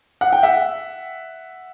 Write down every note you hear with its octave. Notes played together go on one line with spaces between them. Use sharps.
F#5
G5
E5 F#5